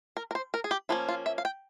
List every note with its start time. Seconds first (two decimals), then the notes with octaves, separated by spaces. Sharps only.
0.17 A#4
0.31 A#4
0.35 C5
0.54 A#4
0.64 G#4
0.71 G4
0.89 F3 A#3 C#4 E4
1.09 F4
1.26 E5
1.38 F5
1.45 G5